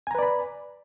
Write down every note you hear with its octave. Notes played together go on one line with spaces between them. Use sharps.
B4 D5 G#5 A#5 B5